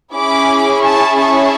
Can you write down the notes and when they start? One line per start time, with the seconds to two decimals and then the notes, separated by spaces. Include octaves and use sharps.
0.14 C#4 E4 G#4 B5 D6
0.83 A5 C#6
1.18 A5 C#6